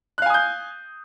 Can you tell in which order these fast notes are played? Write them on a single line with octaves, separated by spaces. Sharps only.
F#6 F5 G#5 D#6 G6